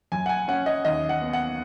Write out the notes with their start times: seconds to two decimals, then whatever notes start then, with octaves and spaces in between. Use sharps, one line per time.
0.12 F#2 G#5
0.26 F#5
0.29 G#5
0.48 C#4 F#5
0.66 D#5
0.85 D#2 D#5
1.09 F#5
1.21 B3
1.33 F#5